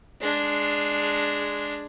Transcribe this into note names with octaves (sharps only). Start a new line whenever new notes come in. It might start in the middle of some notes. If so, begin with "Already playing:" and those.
G#3 D4